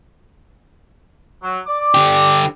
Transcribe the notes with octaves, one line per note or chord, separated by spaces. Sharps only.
F#3
D5 D6
D3 G4